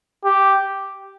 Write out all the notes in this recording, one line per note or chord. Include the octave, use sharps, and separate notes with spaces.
G4